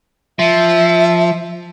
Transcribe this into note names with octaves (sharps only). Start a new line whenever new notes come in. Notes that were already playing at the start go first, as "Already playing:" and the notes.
F3 E5